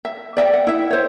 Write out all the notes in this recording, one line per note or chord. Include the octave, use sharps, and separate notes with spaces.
E5
D5 E5 F#5 G5
F#5
E4 E5
C5 C#5